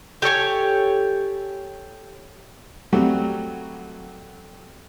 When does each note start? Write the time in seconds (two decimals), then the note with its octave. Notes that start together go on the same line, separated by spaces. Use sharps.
0.22 G4 A4 C#5 G#5
2.92 F#3 G3 A3 C4 F#4